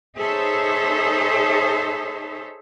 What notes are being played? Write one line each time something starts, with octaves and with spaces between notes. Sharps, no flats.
D#4 G#4 A4 C5 C#5 E5